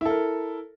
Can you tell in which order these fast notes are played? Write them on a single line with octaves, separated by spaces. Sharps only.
E4 A4 A#4